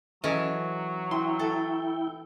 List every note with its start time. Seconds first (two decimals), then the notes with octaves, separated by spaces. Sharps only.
0.24 E3 F#3 C#4 G#4 A4 D#5
1.11 E4 G5 C6
1.39 A4